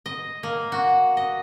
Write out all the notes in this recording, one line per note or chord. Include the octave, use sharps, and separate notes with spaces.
D#5
A#3
F#4
D#5